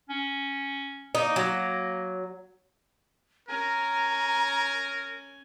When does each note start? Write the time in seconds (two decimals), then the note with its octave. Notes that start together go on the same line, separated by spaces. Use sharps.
0.09 C#4
1.15 A#3 D#4
1.36 F#3
3.49 C#4 A#4 G#5 A#5